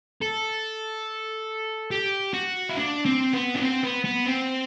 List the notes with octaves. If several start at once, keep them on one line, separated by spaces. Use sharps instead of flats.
A4
G4
F#4
E4
D4
C4
B3
D4
C4
B3
B3
C4